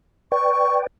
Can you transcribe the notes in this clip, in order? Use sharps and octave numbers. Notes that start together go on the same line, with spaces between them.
B4 D5 G5 C#6